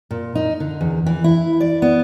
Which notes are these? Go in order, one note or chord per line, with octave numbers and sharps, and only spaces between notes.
A#2
D#4
D3
E2
E3
E4
D5
B3